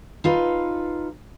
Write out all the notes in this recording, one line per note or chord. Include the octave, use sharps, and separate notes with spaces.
D#4 F4 A4 B4